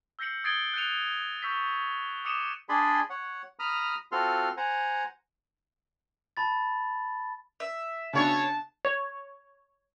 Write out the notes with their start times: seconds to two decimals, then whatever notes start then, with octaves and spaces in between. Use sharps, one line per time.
0.19 E6 G6 A#6 C7 C#7 F#7
0.44 D#6 G#6 A6 C7 D7 G7
0.74 F#6 G6 A6 C#7 D#7 F7
1.42 C#6 E6 G6 B6
2.25 D6 D#6 C#7 D#7 E7
2.69 D4 G#4 D5 G#5 B5 C6
3.10 C#5 F#5
3.59 A#5 B5 D#6 F6
4.12 C4 F4 F#4 A4 C6 F6
4.57 C5 F#5 G#5 A#5
6.37 A5 B5 A6
7.60 E5
8.13 C#3 B3 D4 F#4 C#5 A5
8.85 C#5